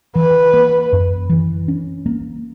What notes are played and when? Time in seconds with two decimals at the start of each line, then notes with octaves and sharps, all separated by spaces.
0.15 E3 B4
0.53 A#3
0.92 F#2
1.29 E3
1.68 C#4
2.06 A#3